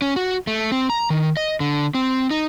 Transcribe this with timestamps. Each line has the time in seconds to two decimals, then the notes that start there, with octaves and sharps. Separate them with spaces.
0.02 C#4
0.16 F#4
0.47 A3
0.72 C4
0.90 A#5
1.10 D#3
1.37 D#5
1.60 D3
1.95 C4
2.31 D#4